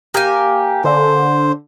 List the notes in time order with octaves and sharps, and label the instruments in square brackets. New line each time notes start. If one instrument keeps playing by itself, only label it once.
[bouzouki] A#3 A#4 G#5 [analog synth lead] G4
[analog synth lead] D3 [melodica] C5